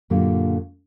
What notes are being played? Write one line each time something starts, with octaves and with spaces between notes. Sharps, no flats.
F#2 A#2 D3 G4